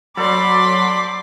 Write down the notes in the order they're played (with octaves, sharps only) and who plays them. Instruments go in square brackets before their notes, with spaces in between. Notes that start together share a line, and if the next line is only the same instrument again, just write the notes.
[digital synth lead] F#3 [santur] A4 C5 D5 [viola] B5 C6 [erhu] D6